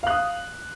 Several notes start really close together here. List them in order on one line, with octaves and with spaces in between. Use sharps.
F5 F#6 D#6